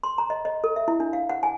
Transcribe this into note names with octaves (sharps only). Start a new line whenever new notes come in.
C6
A#5
D#5
D#5
A4
E5
E4
D4
F5
F#5
G#5